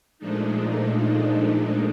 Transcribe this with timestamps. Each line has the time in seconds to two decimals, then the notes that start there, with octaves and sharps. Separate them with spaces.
0.19 A#2 F3 G#3 A3 D4 D#4